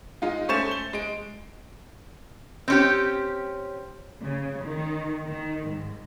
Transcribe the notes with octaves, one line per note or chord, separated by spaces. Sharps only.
G#3 D#4 F4
A3 C#4 C5 C#6 A6 E7
G7
G#3 D7
C4 C#4 G4
C#3
D#3
D#3
G#2